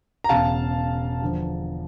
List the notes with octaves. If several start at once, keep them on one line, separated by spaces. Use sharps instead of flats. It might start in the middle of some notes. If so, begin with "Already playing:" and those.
A#5
E1 E2 C#3 F5 A5
E2 D3 F3